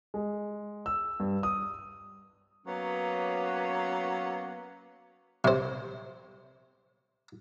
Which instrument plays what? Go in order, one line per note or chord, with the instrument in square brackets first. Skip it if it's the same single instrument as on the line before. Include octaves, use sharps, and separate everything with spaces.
[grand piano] G#3
E6
G2
D#6
[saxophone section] F#3 A#3 B3 C#4
[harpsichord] C3 C5